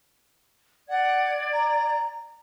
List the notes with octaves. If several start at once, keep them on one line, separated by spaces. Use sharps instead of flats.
D5 F#5 G#6
A#5